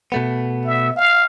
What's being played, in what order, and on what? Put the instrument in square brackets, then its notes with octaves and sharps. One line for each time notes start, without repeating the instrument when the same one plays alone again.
[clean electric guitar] B2 A3 B3
[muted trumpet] E5
F5